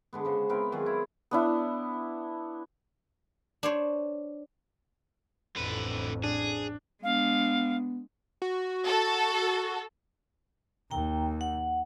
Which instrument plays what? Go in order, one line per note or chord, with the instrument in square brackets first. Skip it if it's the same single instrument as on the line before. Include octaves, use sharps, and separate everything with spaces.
[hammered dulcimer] D3 G#3 B3
C#3 C5
B3 C4 E4 A#4
D#3 F#3 F4 G#4
E4
[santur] B3 D4 E4
[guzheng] D4 C5 C#5
[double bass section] A1 F2 [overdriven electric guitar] D3 B4
[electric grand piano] D4 [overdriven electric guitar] G#4
[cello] G#3 D4 [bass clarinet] B3 [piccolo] F5
[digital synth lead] F#4
[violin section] A4
[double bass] D#2 [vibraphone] G5 A#5
[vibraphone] F#5